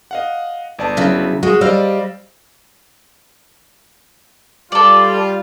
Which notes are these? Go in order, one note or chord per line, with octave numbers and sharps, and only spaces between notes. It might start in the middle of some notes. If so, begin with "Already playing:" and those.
D#5 F5 F#5
G1 D5 A5
C#3 F#3 E4
G#3 F#4 G#4
G3 C5 D5 D#5 F5 E6
G3 F4 A4 D5